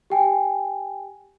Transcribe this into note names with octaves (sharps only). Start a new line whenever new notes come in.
G4 G5 G#5